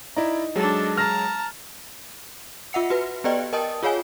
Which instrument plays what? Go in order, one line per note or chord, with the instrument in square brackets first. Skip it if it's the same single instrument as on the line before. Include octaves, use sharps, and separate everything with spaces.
[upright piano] D#4 [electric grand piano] E4 D5 A#5
[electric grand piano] F#3 G#3 G#4 [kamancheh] D4 A4
[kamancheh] A5 A#5 [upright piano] F6 A#6
[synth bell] F4 E5 F#5 C#7
F#4 B4
B3 G4 B4 D5 D#5 G5
A#4 D#5 G5 A5 D#6
F4 G#4 C#5 F5 G#5